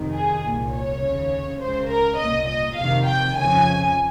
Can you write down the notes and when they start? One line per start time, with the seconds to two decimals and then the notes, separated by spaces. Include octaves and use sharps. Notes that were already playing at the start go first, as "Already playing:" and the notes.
Already playing: F2 C3 D#3
0.15 G#4
0.44 C2 A#2
0.73 C#5
1.02 C#3
1.07 D#2
1.60 C#2 C#3 C5
1.90 A#4
2.19 C2 A#2 D#5
2.48 D#5
2.77 F2 C3 D#3 F5
3.06 G5
3.35 F2 C#3 G#5